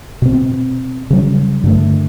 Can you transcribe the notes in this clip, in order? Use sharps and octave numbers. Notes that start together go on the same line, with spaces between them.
B2 C4
C#3 F#3 G3
G2 D3 A3